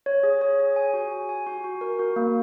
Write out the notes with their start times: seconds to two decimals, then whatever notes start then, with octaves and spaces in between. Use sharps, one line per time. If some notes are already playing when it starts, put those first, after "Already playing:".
0.06 C#5
0.23 G#4
0.41 C#5
0.59 G#4
0.76 G#5
0.94 F#4
1.11 G#5
1.29 G#5
1.47 F#4
1.64 F#4
1.81 A#4
1.99 F#4
2.16 A#3